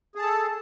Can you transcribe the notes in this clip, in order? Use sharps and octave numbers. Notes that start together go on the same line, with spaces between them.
G#4 A4 A5